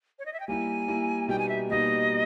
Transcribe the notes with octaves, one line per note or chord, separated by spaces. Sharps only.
C#5
D#5
E5
G5
G3 A#3 E4 G#5
G3 A#3 E4
B2 G3 A#3 D#4 G5
G#5
E5
B2 G3 A#3 D#4 D#5